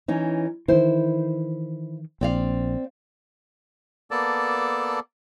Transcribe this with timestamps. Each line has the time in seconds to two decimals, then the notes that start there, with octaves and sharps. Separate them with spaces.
0.08 E3 C#4 D#4
0.68 D#3 E3 E4 C5
2.21 A#1 C4 D5 F5
4.11 A#3 B3 A4 D5 A5